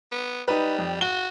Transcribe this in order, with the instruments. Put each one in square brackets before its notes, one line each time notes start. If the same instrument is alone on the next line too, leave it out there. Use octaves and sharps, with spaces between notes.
[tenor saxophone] B3
[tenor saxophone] G3 [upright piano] D#4 B4
[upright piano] F2
[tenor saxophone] F#4 [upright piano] G7